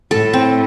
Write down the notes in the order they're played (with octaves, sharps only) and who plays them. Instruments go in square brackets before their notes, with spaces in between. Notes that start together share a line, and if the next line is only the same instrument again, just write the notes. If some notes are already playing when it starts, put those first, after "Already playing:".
[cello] A2 [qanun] A4
[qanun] C4